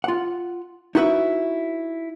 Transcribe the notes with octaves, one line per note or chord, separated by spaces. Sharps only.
F4 F#5
D#4 E4 F#4 B4 C#5 E5